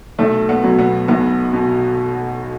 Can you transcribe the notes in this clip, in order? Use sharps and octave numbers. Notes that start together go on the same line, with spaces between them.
B1 A3
B3
B2 F#3
B3
B1 B3
B2